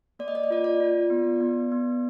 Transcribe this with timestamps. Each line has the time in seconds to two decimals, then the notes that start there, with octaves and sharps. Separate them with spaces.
0.19 A#3 D5
0.28 D#5
0.35 D5
0.44 D#5
0.50 F4 D5
0.64 D5
0.80 F4
1.10 B3
1.41 B3
1.72 B3